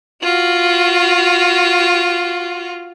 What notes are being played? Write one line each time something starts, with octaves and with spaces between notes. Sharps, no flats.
F4 F#4